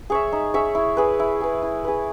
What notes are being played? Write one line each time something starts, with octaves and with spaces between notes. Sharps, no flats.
G#4 C#5 E5
D#4
G#4 C#5 E5
E4
G#4 B4
E4
G#4 B4
E4
G#4 B4